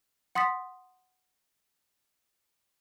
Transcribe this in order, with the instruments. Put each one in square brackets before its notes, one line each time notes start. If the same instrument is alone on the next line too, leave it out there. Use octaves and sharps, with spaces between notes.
[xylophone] F#5 C6 D#6 A6 B6